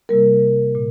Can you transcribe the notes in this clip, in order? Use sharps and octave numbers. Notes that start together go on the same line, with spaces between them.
C3 G3 A#3 A#4
A#2